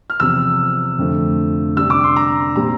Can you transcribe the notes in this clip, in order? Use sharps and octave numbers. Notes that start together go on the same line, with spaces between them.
F6
E2 C3 F3 E6
F2 D3 F3 A3
C3 G3 D4 E6
D6
C6
A#5
A#2 G3 C4 A#5